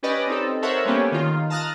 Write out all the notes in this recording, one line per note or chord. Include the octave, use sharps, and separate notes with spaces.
C#4 G4 B4 D5 D#5
C4 D#4 A4
A4 A#4 C5 C#5 E5 F#5
G3 A#3 B3 C#4 G4
D#3 F4
A5 A#5 D#6 F6 F#6 A6